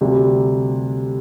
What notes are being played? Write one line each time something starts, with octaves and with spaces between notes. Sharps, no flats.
D2 C3 G3